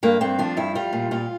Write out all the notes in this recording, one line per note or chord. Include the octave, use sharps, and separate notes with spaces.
G2 A#3
G2 C4
F3 D4
G2 E4
G3 F4
A#2
A#2 F4